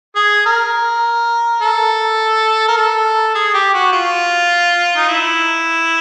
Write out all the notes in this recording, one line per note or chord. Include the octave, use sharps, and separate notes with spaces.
G#4
A#4
A4
A#4
A4
G#4
G4
F#4
F4
D#4
E4